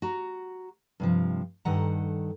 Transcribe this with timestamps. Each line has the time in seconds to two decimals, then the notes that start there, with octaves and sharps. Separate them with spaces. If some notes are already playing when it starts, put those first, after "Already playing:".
0.02 F#4 A#5
1.00 G2 C3 F3
1.65 G2 D#3 A4 F#5 A#5